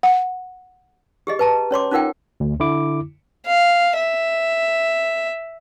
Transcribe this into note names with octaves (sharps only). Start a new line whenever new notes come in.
F#5
G4 G#4 D#5
B4 A5 A#5
C#4 C#5 C6 D6
C#4 D#4 F4 A#4 F#5 G5
D2
D3 E4 D6
F5
E5